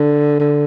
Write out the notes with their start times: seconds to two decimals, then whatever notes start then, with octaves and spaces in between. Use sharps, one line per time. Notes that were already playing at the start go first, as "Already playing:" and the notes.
Already playing: D3
0.40 D3